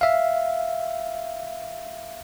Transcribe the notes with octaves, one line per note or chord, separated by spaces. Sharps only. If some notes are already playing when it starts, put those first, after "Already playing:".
E5 F5